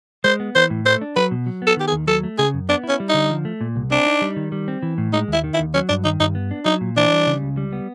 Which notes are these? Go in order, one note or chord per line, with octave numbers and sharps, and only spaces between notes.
G#3 C5
B3
E3 C5
A2
A3 C5
D4
F#3 B4
B2
F#3
B3
A4
D#3 G4
G#4
D#2
F#3 A4
A3
C#3 G#4
F#2
B3 D4
E4
C#4
G3
D#4
D3
F3
A3
A#2
C2
C4 D4
D#4
G3
D#3
G3
C4
E3
A2
G#3 D#4
D#2 E4
D#3
E4
D#2
F#3 C#4
G2 D4
D#3 D#4
G2 D#4
B3
D4
F#3 D#4
A#2
E3 D4
G3
C#3
C#2
G3
B3